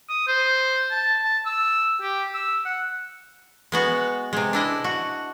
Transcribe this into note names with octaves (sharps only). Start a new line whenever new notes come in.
D#6
C5
A5
A5
E6
G4
E6
F#5
G#3 B3 F#4
C3 G#3
D4 E4 D#5
F#4